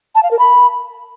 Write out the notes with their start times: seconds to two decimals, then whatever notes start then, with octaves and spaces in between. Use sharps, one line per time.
0.15 A5
0.23 F5
0.31 A#4
0.39 B5